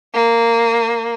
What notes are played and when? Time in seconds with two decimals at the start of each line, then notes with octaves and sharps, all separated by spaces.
0.14 A#3